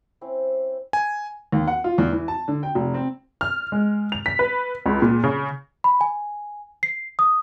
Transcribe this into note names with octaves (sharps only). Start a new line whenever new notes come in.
C4 C#4 E4 C5
G#5
D#2
F#5
F4
E2
E3
A5
D3
G5
F1
C4
F6
G#3
F7
B6
B4
C#2
A#2
C#3
B5
G#5
C7
D#6